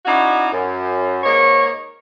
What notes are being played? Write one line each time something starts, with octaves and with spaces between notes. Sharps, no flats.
C#4 D#4 E4 F#4 D5 D#5
F#2
G#2 A#3 D#4 C#5